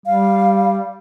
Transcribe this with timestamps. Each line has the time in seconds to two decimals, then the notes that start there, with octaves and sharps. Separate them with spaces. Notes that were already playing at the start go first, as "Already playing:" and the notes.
0.06 G3 F5